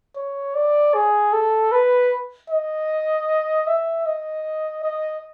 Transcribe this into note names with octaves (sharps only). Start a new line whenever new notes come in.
C#5
D5
G#4
A4
B4
D#5
E5
D#5
D#5